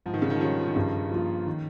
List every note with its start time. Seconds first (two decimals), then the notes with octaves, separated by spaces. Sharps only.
0.06 G#2 F3
0.14 D#3
0.22 C#3
0.30 D#3
0.36 F3
0.41 D#3 G3 C#4 F4
0.60 F3
0.68 D#3
0.76 G2 C#3
1.11 F3 A#3 F4
1.47 D#3